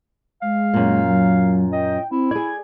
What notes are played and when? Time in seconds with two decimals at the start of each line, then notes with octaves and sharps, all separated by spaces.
0.42 G#3 F5
0.74 F#2 A#2
1.07 F#3
1.72 D#5 G5
2.11 C4 E4
2.31 G#4 D5 G#6